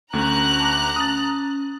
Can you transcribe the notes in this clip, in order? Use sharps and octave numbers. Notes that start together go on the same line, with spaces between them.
D2 A3 C#4 A#5 F#6
A5 D6
C#4 D#6 A6